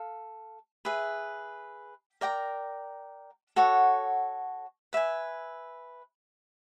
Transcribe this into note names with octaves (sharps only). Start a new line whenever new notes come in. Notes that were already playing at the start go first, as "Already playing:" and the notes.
Already playing: A4 F5
G#4 B4 E5
A#4 D5 G5 A#5
F#4 A4 C#5 F#5
B4 E5 G#5